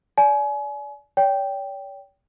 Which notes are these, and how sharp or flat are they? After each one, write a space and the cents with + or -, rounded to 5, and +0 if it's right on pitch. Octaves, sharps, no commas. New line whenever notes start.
D5 -25 G#5 +30
C#5 +45 G5 +0